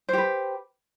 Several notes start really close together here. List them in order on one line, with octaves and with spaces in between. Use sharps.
C5 G4 B4